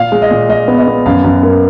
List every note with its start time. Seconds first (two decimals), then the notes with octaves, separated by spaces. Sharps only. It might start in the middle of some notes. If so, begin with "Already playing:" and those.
Already playing: A#2 F5
0.12 G#3
0.22 D#5
0.30 A#2
0.49 G#3 D#5
0.68 B3
0.78 D#5
0.87 B3
1.06 F#2 F5
1.24 F#2
1.43 A#3